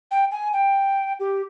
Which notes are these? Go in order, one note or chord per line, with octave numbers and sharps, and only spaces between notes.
G5
G#5
G5
G4